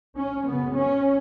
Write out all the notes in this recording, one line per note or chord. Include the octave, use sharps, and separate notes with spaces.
C#4
F#2 C#3 B3
C#4